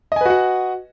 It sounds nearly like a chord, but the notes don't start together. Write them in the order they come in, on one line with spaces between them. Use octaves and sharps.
D#5 G#5 B4 F#4 F#5